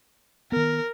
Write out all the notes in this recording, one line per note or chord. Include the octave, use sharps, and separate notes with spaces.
D#3 B3 A#4